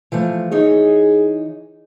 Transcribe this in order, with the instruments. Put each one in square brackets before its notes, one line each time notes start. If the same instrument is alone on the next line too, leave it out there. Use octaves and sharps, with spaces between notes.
[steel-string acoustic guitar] E3 F3 A3
[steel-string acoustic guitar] E3 D#4 C#5 [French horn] G#4